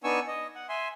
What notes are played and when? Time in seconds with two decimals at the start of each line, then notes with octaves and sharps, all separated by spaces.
0.04 B3 D4 D#4 G#5 C#6 E6
0.28 D#5
0.55 F#5
0.69 E5 G#5 C6